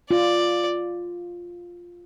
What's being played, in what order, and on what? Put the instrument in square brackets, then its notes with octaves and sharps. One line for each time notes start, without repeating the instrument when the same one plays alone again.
[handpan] F4 [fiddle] D5